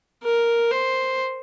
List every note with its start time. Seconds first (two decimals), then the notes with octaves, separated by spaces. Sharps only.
0.23 A#4
0.71 C5